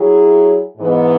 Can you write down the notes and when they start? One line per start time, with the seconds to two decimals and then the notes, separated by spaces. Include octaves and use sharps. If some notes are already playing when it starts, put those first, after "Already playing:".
Already playing: F#3 E4 G#4
0.78 G#2 E3 B3